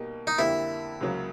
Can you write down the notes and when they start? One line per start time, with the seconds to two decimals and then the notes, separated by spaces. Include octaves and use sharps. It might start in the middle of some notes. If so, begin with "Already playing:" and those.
Already playing: B2 G3 A#3 D#4 G4
0.27 D#4
0.38 F2 D3 G3 A#3 E4
1.01 C#2 C#3 F#3 A#3